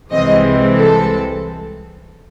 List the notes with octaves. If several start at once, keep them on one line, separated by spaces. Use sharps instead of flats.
C2 C3 E3 G#3 C4 D#5
A4